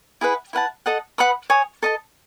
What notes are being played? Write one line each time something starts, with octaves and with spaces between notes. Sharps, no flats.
E4 G#4 B4 F#5
E4 B4 F#5 A5
A4 D#5 F#5
B4 F#5 B5 D#6
C#5 G#5 D#6
A4 D#5 A5